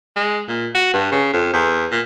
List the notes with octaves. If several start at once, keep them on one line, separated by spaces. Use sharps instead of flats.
G#3
A#2
F#4
G2
C#3
F2
E2
A#2